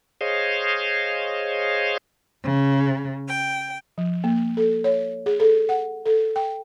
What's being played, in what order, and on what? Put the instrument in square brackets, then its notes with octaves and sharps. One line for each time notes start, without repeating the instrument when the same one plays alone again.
[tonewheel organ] G#4 C5 C#5 D#5 F5
[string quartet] C#3
G5
[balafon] F3
A#3
A4
C#5
G#4
A4
F#5
A4
G5